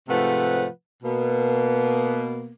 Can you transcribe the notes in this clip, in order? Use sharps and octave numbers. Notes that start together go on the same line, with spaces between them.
G#2 C3 F3 A3 B4 F#5
B2 A#3 B3